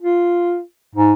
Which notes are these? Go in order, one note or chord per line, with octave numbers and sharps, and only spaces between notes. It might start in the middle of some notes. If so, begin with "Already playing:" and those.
F4
G#2